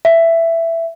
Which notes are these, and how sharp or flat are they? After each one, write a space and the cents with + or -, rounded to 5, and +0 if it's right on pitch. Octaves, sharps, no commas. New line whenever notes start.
E5 +10